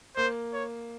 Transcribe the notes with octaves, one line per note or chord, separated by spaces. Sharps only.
A#3 C5
C#5